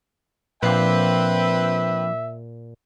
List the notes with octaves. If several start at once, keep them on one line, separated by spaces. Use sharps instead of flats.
A#2 F3 C4 D4 B4 E5 F5 G5